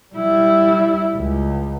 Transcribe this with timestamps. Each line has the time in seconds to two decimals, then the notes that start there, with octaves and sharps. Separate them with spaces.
0.15 G3 E4
1.16 C#2